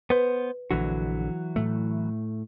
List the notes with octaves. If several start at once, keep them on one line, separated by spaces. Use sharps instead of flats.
B3 B4 C5
A#1 D3 E3 F#3 F#4
A2 A3